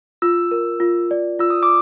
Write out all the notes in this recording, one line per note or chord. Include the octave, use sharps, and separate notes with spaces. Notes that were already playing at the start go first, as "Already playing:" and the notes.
F4 E6
A#4
F4
D5
F4 E6
D#6
D6